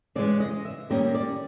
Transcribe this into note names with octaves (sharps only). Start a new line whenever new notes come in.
C#3 E3 G#3 C#4 D5
D#5
E5
D#3 G3 A#3 C#4 D#5
D5